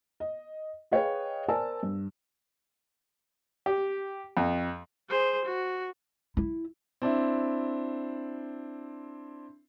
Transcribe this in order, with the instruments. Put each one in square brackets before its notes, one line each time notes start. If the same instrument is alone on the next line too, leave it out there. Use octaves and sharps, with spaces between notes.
[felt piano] D#5
G#4 B4 C#5 D#5 F5 G5
A#4 C5 D5 G#5 A5 E6
G2
[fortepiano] G4
F2
[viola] G#4 C5
F#4
[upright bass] E4
[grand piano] C4 D4 E4